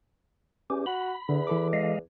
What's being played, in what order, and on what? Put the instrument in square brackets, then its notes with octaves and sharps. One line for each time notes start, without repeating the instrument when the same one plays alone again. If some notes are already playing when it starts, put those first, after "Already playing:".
[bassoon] E2 [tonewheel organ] C#4 G4
[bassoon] F#4 [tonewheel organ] B5
[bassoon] E2 [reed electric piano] D3
[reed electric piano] E3 A4 D6
[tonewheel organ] G#3 D#5 F5